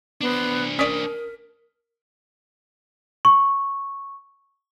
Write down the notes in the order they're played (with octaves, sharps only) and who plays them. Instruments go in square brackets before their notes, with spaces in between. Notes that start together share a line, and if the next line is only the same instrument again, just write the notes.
[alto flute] B3 [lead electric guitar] D4 C5
[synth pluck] C#4 D5 [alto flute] A#4 [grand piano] D#6 B6 D7
[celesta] C#6